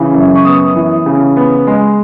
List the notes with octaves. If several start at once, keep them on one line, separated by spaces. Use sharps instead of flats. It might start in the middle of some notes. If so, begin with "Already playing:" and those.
Already playing: C#3 E3
F#2
C#6
B3 D#6
E3
C#3
B3
G#3